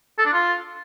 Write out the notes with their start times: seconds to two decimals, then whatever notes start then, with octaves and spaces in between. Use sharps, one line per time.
0.18 A4
0.26 D4
0.33 F4